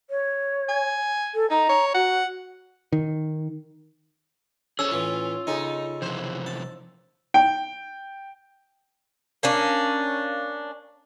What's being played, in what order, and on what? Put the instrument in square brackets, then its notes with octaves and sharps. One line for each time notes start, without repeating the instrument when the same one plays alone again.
[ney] C#5
[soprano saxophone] G#5
[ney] A4
[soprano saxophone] D#4 [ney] A#5
[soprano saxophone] C#5
[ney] F#4 [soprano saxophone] F#5
[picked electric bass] D#3
[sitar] C#4 [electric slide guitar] G#4 A4 C5 [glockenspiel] E6
[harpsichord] A2 E3 [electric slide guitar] F4
[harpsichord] C#3 A4 G#5 [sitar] D#4
[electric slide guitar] C3 E3 F3 [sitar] C5
[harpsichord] A5
[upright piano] G5
[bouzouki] A#3 C#4 D4